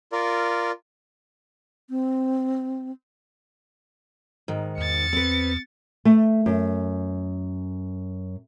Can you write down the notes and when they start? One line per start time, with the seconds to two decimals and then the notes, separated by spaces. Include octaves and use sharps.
0.12 F4 A#4 D5
1.90 C4
4.48 G#2 D#3
4.78 E2 A6 C#7
5.13 C4 B4
6.05 A3
6.46 F#2